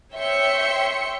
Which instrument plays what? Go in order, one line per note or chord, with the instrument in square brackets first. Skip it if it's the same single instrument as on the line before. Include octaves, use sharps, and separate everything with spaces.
[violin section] C#5 E5 G5 C6 C#7